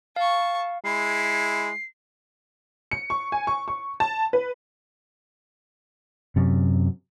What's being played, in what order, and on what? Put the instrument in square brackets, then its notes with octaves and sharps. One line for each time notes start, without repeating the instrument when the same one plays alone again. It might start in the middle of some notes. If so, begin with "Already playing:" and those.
[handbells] F5 [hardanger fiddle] A5 C#6
[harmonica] G#3 E4 [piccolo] C7
[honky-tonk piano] C#7
C#6
G#5
C#6
C#6
A5
B4
[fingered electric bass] F#2 C3